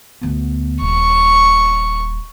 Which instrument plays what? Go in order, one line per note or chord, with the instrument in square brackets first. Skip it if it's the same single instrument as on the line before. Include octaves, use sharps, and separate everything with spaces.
[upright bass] D2 B3
[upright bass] D#1 [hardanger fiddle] C#6